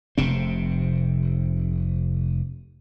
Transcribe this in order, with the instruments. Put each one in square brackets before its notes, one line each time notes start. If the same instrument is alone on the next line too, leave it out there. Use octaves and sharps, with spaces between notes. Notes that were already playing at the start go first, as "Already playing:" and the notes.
[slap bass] F1 C3 C4